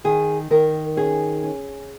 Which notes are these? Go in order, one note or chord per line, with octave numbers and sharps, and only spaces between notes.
D#3 G#4
D#3 A#4
C#4 G#4
C#4